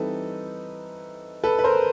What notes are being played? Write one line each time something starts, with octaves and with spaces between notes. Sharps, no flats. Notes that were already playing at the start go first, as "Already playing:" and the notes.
Already playing: E3 G3 C4 D#4 A4 B4
A4 B4
B4
A#4 C5